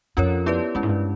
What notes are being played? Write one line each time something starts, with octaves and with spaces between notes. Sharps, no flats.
F2 C#4 F4 A#4 C#5
B3 E4 G4 B4 D5
F#2 G#3 C#4 E4
G#2
G2